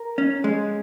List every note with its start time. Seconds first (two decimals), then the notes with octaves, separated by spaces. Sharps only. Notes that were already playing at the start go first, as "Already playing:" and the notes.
Already playing: A#4
0.18 C#4
0.44 G#3